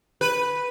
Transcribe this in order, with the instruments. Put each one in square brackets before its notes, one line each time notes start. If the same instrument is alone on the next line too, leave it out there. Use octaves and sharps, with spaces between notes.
[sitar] B4